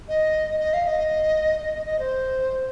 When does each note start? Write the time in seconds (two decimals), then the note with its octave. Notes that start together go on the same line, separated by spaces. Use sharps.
0.09 D#5
0.60 D#5
0.73 F5
0.87 D#5
1.61 D#5
1.74 D#5
1.86 D#5
1.99 C5